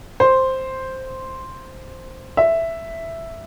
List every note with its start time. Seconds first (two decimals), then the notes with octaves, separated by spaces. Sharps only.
0.20 C5
2.37 E5